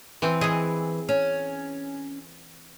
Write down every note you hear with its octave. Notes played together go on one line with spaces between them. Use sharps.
E3 C4
E3 G#4 D#5
C#4